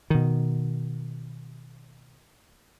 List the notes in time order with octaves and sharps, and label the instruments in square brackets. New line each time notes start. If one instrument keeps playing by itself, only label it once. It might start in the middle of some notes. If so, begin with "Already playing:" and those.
[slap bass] B2 D#3